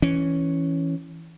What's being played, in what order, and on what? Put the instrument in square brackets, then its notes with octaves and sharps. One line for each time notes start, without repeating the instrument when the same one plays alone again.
[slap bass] E3 C#4